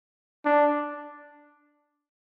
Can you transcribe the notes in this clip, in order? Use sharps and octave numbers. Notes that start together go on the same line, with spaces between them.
D4